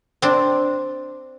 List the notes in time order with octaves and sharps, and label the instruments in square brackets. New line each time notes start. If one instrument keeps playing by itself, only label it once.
[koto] C4 D4